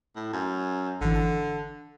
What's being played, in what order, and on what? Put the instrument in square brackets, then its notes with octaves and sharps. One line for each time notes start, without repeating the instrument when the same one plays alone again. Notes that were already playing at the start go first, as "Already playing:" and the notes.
[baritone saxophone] A2
F#2
[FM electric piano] G#1 E3 [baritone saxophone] D3
[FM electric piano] A5